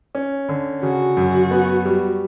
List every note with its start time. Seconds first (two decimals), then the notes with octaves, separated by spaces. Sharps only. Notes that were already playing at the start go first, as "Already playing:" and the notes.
0.15 C#4
0.49 D3
0.82 C#3 F#4
1.17 F#2
1.51 B3
1.85 G3